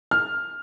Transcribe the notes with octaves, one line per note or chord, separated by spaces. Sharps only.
F6